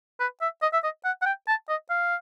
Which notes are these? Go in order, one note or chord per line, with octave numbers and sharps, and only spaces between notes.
B4
E5
D#5
E5
D#5
F#5
F#5
G5
A5
D#5
F5